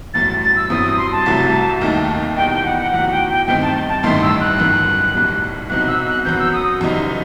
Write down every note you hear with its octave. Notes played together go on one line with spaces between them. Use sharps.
A1 G2 F#3 A3 A6
A6
E6
G2 F#3 C4 E4 D#6
D#6
C6
A5
C2 C3 F#3 A3 E4
D#2 D#3 A3 D#4
E2 B2 G3 D#4 G5
G5
F#5
F#5
E2 D#3 F#3 A3 F#5
G5
G5
G2 D#3 A3 C4 D#4 G5
A5
A5
A1 G2 D#3 A3 D#4 C6
E6
F#6
G1 F#2 D#3
B1 A2 G3
C2 B2 F#3 C4 D#4 F#6
E6
F#6
F#2 F#3 B3 G6
E6
D#6
F#1 F#2 E3 G3 D#4